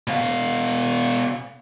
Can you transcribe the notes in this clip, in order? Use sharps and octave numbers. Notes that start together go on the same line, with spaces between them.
B2 F5